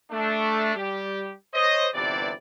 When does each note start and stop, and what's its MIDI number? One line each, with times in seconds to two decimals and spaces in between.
0.12 0.76 57
0.12 0.76 62
0.76 1.33 55
0.76 1.33 67
1.54 1.87 72
1.54 1.87 73
1.54 1.87 75
1.94 2.31 31
1.94 2.31 40
1.94 2.31 48
1.94 2.31 52
1.94 2.31 74